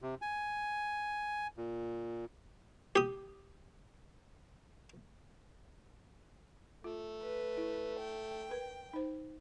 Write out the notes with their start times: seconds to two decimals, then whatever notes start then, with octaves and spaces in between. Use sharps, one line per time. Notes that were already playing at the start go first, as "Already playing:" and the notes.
0.02 C3
0.22 G#5
1.57 A#2
2.96 G4 D#6
6.84 A3 F4
7.23 B4
7.57 E4
8.00 G5
8.50 A#4 B4
8.93 D#4 C5